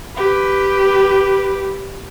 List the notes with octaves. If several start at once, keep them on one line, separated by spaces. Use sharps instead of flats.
G4 B4